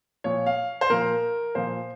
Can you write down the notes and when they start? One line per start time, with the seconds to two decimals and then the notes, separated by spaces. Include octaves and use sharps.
0.24 A#2 F3 C#5
0.46 F5
0.81 C5
0.90 A#2 F3 A#4
1.55 A#2 F3 C5